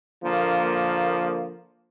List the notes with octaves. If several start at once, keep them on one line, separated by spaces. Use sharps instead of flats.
D3 F3 A#3